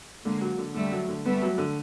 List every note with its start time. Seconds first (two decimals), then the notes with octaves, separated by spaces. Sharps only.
0.24 D3 G#3 A#3
0.41 F#3
0.58 D3
0.74 D3 G3 A3
0.92 F#3
1.08 D3
1.25 G3 A3 B3
1.42 F#3
1.58 D3